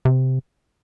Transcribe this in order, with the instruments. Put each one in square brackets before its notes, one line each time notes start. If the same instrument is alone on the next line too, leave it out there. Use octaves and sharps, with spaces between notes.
[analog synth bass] C3